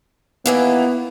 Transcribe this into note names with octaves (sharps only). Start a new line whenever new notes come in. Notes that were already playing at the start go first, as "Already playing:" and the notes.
D#2 E3 A#3 B3